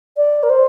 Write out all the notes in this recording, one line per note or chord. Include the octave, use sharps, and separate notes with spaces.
D5
A#4
C5